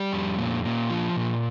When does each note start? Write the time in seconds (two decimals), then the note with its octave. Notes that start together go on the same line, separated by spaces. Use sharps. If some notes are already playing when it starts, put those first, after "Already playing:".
Already playing: G3 G4
0.12 F2
0.38 A#2
0.64 A#2
0.90 F3
1.16 A#2